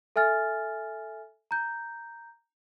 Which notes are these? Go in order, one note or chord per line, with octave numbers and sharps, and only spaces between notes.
A4 E5 G#5 F6 A6
A#5 G6